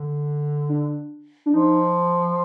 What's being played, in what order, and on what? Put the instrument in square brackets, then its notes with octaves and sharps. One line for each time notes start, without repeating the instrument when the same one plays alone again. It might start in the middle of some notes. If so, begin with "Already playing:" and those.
Already playing: [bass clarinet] D3
[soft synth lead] D4
D4
[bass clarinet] F3 [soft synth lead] D#4